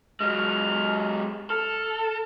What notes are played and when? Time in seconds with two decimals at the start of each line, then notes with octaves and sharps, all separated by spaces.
0.20 F#3 G#3 F6
1.50 A4 F6